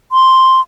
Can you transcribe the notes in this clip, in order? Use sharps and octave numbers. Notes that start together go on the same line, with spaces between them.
C6